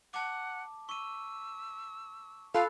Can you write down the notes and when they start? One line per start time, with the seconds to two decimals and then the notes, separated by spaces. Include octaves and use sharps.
0.14 F#5 A5 D6
0.89 C#6 E6 D#7
2.55 F4 A4 F5 B5 F#6